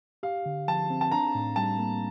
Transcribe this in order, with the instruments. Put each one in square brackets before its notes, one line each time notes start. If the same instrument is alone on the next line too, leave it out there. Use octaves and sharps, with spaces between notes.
[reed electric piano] G4 [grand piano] F5
[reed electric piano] D3
[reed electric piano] F3 [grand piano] A5
[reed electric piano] C4
[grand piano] A5
[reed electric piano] D4 [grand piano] A#5
[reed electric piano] A2
[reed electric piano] G3 [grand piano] A5
[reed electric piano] A#3